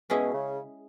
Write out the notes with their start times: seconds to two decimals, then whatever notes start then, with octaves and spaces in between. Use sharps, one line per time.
0.10 B2 G#3 C#4 E4 G#4
0.33 C#3